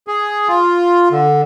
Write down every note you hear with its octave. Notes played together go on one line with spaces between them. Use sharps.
G#4
F4
D3